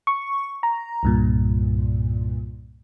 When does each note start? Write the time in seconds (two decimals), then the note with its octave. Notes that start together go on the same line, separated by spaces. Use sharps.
0.07 C#6
0.63 A#5
1.03 C2 G2 A#2